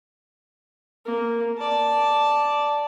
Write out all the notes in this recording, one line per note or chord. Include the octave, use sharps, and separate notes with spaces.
A#3
D5 A5